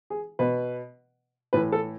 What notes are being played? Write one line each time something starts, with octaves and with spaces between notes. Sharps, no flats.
G#4
B2 B4
A2 E3 B4
A4